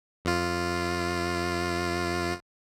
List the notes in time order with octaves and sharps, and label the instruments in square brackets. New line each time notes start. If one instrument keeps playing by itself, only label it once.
[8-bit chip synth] F2 F4